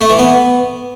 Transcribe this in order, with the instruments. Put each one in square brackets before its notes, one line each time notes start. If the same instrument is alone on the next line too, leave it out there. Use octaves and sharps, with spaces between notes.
[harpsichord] A3
E3
B3